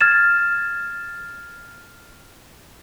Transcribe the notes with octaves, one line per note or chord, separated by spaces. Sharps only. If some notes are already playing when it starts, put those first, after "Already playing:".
F6 G#6 A6 E7